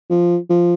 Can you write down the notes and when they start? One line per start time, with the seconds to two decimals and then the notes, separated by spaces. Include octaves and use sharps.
0.10 F3
0.50 F3